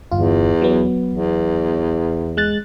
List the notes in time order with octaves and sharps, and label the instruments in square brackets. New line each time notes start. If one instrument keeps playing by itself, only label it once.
[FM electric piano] G1 F4 [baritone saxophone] E2
[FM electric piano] F#3 B3
[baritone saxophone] E2
[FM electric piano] G#3 F#6 A6